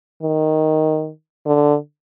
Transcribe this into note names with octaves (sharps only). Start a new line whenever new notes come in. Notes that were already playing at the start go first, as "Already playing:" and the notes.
D#3
D3